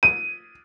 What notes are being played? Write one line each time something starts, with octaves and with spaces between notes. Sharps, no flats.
D#7